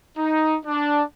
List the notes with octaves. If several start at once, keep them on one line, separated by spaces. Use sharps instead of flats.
D#4
D4